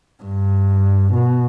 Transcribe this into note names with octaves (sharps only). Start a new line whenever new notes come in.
G2
B2